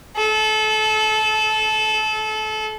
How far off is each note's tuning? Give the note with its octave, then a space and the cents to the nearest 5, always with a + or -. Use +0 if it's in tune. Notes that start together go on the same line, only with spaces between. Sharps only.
A4 -25